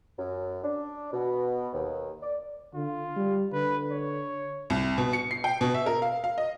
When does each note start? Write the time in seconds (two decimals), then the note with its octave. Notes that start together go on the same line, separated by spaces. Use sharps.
0.19 F#2
0.63 D4
1.12 B2
1.73 D#2
2.23 D5
2.75 D3 F4
3.16 G3
3.53 D3 B4
3.91 C#5
4.70 C2
4.98 B2
5.13 C#7
5.31 C7
5.44 G5
5.61 B2
5.74 E5
5.86 A#4
6.02 F5
6.24 F5
6.38 D#5